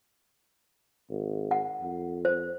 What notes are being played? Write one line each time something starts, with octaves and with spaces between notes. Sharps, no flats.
G#1
F#5
F2
C5